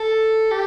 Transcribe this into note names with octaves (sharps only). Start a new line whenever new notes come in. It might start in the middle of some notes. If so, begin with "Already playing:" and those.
Already playing: A4
G4